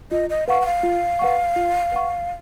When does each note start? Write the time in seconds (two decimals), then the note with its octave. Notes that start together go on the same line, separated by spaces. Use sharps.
0.11 F4 D#5
0.30 D#5
0.47 B4 F5 F#5 C#6
0.61 F#5
0.65 F5
0.83 F4
1.19 B4 F#5 C#6
1.56 F4
1.92 B4 F#5 C#6